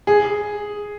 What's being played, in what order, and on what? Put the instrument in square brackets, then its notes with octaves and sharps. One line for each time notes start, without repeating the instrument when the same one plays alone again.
[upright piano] G#4